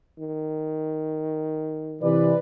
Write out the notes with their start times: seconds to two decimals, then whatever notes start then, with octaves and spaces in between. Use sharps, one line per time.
0.19 D#3
2.02 C3 E3 B4 D5